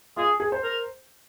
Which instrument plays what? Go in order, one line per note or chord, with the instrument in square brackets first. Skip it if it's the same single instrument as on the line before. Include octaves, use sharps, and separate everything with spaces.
[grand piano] F4 [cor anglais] G#4
[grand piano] G#4
C5
[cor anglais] A#4